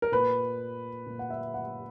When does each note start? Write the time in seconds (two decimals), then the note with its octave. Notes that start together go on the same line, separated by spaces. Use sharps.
0.02 A#4
0.12 A#2 B4
1.06 A#2
1.19 F#5
1.30 E5
1.54 F#5